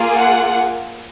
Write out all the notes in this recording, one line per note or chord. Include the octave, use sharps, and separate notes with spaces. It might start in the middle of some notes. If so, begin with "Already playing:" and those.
Already playing: A#3 F4 G#4
F#5